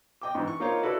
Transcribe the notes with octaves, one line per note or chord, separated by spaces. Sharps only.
D#5 G5 D6
G#2 E3
C#6
A#3 D#4 F4 C5 C#5
E4 F#4 A4 B4 D5